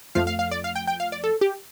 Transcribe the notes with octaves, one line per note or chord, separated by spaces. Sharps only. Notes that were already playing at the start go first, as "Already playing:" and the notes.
F2 F3 A3 F5
F5
F5
D5
F5
G5
G5
F5
D5
A4
G4